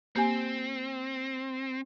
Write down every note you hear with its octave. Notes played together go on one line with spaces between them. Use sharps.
A#3 C4 G4 G#5